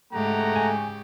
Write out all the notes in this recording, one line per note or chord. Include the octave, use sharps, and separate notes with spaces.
G#2 C#3 A3 G4 F#5 A#5
G#5